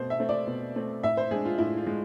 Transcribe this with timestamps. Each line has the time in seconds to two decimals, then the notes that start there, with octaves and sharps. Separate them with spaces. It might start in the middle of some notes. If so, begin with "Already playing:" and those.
Already playing: B2 A3 C4 C5
0.10 E5
0.20 A3 C4
0.29 D5
0.47 B2
0.76 A3 C4
1.03 A2 E5
1.17 C5
1.31 G#3 D4 G#4
1.45 F4
1.58 A2 E4
1.77 F4
1.87 G#3